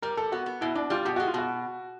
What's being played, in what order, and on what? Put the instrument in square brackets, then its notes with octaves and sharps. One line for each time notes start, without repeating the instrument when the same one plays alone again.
[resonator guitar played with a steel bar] G3 [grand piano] A#4
[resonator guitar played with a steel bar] G3 [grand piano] A4
[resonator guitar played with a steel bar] B3 [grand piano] F#4
[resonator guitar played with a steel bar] B3
[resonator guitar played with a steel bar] B2 [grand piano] E4
[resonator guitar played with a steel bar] B2 [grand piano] D4
[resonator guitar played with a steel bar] G3 [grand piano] F4
[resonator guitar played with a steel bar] B2 [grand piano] G4
[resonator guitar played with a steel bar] G#3 [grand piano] F#4
[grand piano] F4
[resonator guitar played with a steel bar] B2 [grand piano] F#4